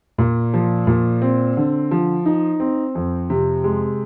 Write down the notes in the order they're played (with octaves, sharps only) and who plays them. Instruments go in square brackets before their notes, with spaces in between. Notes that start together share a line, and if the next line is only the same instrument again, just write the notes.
[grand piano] A#2
F3
A#2
C4
D3
F3
D#4
C4
F2
C3
G#3